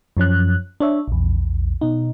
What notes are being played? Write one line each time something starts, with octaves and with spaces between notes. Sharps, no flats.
F#2 F3 C#4 F#6
D4 C#5 E5
A#1 E2
B2 D#4